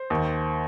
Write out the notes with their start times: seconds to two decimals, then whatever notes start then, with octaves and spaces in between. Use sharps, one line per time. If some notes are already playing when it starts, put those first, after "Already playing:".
Already playing: C5
0.10 D#2